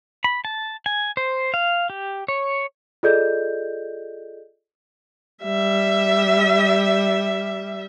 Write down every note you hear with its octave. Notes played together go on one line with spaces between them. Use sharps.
B5
A5
G#5
C5
F5
G4
C#5
F4 G#4 A4 D5 D#5 G6
G3 E5